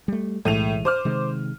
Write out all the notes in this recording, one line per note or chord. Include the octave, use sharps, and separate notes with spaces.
G3 A3
B1 A2 E3 G#3 D#7 F7
C5 D6 F6
C3 D#3 G#3